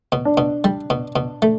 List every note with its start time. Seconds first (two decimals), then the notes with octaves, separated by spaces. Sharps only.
0.12 B2
0.25 D4
0.37 B2
0.64 G3
0.90 B2
1.16 B2
1.42 A3